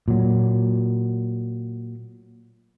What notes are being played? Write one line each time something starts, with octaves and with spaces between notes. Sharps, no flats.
A#2 F#3